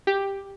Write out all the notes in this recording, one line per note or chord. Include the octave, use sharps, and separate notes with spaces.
G4